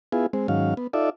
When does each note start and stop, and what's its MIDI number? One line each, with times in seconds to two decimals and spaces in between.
0.12 0.26 59
0.12 0.26 64
0.12 0.26 65
0.12 0.26 68
0.33 0.47 56
0.33 0.47 60
0.48 0.74 44
0.48 0.74 51
0.48 0.74 54
0.48 0.74 61
0.48 0.74 77
0.77 0.87 59
0.93 1.10 63
0.93 1.10 65
0.93 1.10 69
0.93 1.10 74
0.93 1.10 76